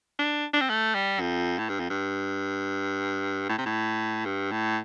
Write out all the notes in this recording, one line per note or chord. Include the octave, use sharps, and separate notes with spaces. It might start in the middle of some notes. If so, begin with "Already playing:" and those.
D4
D4
C4
A3
G3
F2
A2
G2
F2
G2
A2
C3
A2
G2
A2